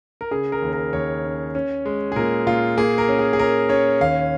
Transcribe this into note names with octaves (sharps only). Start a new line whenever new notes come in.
A#4
C#3 G#4
A#4
D#2
A#4
D#2 C#5
C#4
C#4
G#3
G#4
A#2 A#4
A#2 F4
A#3 G#4
A#4
C#4
G#4
G#4
C#4 A#4
C#4 C#5
D#2 F5